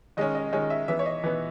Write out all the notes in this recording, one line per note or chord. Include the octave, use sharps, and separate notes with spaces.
D#3 G#3 C#4 D#5
D#5
D#3 G#3 C#4
E5
E3 B3 E5
C#5
D#5
E3 B3